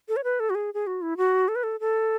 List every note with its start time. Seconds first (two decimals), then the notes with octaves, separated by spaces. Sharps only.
0.09 A4
0.16 C#5
0.24 B4
0.40 A4
0.50 F#4
0.55 G#4
0.74 G#4
0.87 F#4
1.02 E4
1.17 F#4
1.48 A4
1.56 B4
1.63 A4
1.80 A4